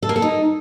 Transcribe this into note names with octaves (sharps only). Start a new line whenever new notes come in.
A4
A#3
A4
D#4